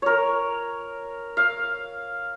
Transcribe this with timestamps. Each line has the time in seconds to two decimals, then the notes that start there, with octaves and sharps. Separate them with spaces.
0.02 A#4 C#5
1.37 F5